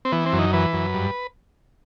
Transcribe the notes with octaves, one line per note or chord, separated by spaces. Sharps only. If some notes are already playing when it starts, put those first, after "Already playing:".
C4
E3 B3
C4
F#2
D#4
E3 B4
F#2
G2